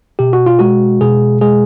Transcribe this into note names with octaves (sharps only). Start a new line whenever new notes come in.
B2 G4
F#4
F4
G#3 F#4
B2 G#4
G#3 G#4